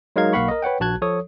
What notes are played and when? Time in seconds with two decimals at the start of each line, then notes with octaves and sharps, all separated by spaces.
0.16 F#3 G#3 D#4 A#4 F5 G#6
0.33 B1 A#3 F5 F#5 B5 C#6
0.48 A#4 D#5
0.62 B4 C#5 F#5 G5
0.80 A#1 F#4 A5 F#6 G#6
1.02 F3 A4 C#5 D#6